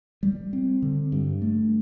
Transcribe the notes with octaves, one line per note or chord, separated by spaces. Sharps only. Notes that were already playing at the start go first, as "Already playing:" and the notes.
G3
C4
D3
G2
A3